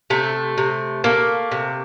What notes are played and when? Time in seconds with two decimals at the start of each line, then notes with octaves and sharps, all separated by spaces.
0.10 C3 A3
0.58 C3
1.04 A3 A#3
1.52 C3